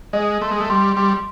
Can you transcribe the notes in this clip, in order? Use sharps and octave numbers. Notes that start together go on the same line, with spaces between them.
G#3 D#5
A3 C6
G#3
A3
G3 C6
G3 C6